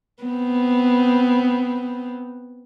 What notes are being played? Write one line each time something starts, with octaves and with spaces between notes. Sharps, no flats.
B3 C4